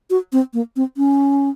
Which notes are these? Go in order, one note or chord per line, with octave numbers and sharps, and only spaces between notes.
F#4
C4
A#3
C4
C#4